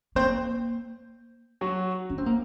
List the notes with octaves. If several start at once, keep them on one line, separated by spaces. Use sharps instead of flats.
A#3 C4 C5
F#3 F#4
C#4
C4
A#3